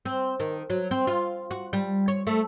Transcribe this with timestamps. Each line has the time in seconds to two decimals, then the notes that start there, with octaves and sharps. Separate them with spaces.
0.05 C4
0.40 D#3
0.70 F#3
0.91 C4
1.07 F4
1.51 F#4
1.73 G3
2.08 C#5
2.27 A3